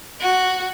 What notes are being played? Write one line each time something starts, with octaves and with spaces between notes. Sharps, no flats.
F#4